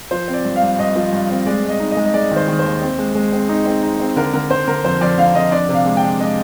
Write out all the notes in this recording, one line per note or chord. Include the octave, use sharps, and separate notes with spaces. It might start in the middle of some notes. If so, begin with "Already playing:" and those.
F3 C5
C4
D5
G2
F5
G2
G2 D#5
F3
G2
C4
G#3 D5
G#3
D#5
D#4
D#5
G#3
D#5
G#3 D5
D#3 C5
D#3
C5
D#2
C4
G#3
G#3
C4
D#4
C4
D#4
C4
D3 A#4
D3 A#4
D3 C5
D3 A#4
F2 C5
F2 D5
D3 F5
F2 D#5
D4 D5
C3
F5
G#3
G5
D4
G#3 D#5